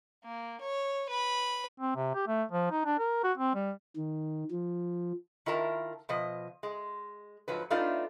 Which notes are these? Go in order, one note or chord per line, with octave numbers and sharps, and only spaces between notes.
A#3
C#5
B4 B5
C4
C3
G4
A3
F3
D#4
D4
A#4
F#4
C4
G3
D#3
F3
D#3 E4 F4 A#4 E5 A5
B2 F3 D#5
G#3
G#2 F3 F#3 B4
A3 B3 D4 D#4 F4 F5